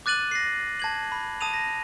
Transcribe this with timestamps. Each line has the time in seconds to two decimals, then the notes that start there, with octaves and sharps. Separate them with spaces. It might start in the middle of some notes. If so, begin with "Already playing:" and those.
0.06 D6 F#6 A6 D#7 F#7
0.31 A#6 C7
0.80 A5 G#6 F#7
1.12 B5
1.41 A5 D#6 D#7 F7
1.54 A#6